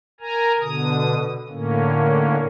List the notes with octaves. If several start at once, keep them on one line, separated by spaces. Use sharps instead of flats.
A#4 G#5 A#5
B2 D3 D#6
A2 D3 A#3 C#4